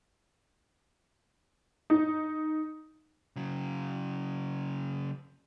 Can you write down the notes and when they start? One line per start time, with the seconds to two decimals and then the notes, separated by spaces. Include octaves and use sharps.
1.90 D#4
3.36 C#3 F#3